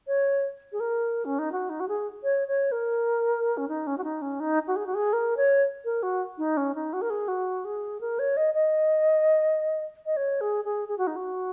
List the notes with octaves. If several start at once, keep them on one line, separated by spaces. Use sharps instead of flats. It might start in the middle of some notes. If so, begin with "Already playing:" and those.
C#5
G#4
A#4
C#4
D#4
F#4
D#4
F#4
G#4
C#5
C#5
A#4
C#4
D#4
C#4
F#4
D#4
C#4
D#4
F#4
G#4
F#4
G#4
A#4
C#5
A#4
F#4
D#4
C#4
D#4
F#4
A#4
G#4
F#4
G#4
A#4
C#5
D#5
D#5
D#5
C#5
G#4
G#4
G#4
F#4
D#4
F#4